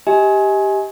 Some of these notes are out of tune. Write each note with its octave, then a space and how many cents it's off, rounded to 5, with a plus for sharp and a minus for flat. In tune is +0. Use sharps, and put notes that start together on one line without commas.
G4 +0 D#5 +35 G#5 +10